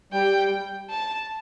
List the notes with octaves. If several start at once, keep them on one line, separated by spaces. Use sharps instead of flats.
G3 G5
A5